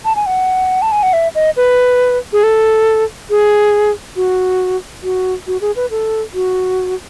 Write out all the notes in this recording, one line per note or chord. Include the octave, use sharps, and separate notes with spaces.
A5
G#5
F#5
A5
G#5
F#5
E5
D#5
B4
G#4
A4
G#4
F#4
F#4
F#4
G#4
B4
A4
F#4